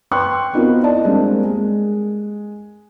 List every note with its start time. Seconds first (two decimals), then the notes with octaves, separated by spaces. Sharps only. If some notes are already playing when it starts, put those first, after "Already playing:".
0.11 B4 G5 C6 C#6 F#6
0.53 B3 C4 D#4 F4 F#4 A#4
0.83 E4 D5 D#5 A5
1.05 G3 G#3 A#3 C4 D4
1.44 G#3